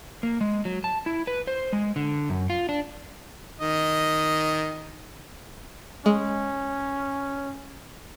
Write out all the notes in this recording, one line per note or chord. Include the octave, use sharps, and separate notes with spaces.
A#3
G#3
F#3
A5
E4
B4
C5
G#3
D3
F#2
F4
D4
D#3 D#5
G#3 C#4